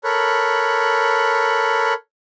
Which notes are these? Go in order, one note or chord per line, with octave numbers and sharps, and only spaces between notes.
A4 A#4 C#5 B5 F#6